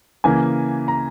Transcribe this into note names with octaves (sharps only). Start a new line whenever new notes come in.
C#3 E3 A#3 G#5
A#5